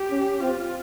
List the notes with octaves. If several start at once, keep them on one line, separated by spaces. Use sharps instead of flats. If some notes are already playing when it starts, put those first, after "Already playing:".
Already playing: G4
C#4
C4 F4